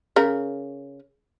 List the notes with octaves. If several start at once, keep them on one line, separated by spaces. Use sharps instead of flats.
C#3 A#4